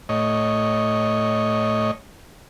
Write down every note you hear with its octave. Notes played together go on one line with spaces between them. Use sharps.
A2 C#5 D#5